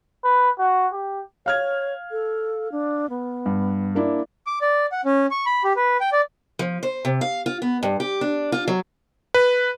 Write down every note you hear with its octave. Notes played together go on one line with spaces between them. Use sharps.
B4
F#4
G4
C#5 F5 F6 G#6
A4
D4
B3
G2
A#3 D4 E4
D6
D5
F#5
C#4
C#6
B5
G4
B4
G5
D5
F3
C5
C3
F5
F4
B3
G2
G4
D4
F4
F#3
B4